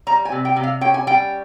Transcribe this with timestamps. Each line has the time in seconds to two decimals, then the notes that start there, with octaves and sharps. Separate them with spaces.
0.07 G3 A#5
0.25 G#5
0.32 C3
0.45 G5
0.56 C3
0.63 F5
0.81 C#4 G5
0.94 G#5
1.07 G3 G5